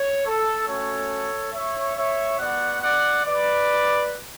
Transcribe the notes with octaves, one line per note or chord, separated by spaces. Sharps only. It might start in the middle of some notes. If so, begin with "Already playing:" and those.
Already playing: C#5
A4
A3 C#4 F#4 A4 C#5
C#5 E5
C#5 E5
B3 F#4 D5 F#5
D5 F#5
B4 D5